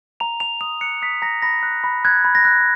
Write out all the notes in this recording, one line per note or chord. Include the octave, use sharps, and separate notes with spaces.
A#5 F7
A#5 F7
D#6 F7
F#6 C#7
D#6 B6
A#5 A#6
B5 A#6
F#6
B5
F#6 G#6
B5
A#6
F#6